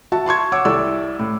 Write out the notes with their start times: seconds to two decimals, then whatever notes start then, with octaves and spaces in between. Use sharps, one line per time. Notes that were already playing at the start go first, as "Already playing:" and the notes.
0.12 F#4 E5 A5
0.26 A5 C6 C#6 G#6
0.52 C#5 F#5 C#6 D6 E6
0.65 C2 E4 A4 D5 E6
1.19 A2